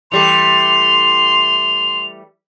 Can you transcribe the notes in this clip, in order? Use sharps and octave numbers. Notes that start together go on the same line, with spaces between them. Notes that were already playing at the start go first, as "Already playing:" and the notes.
E3 G3 A3 C6 F7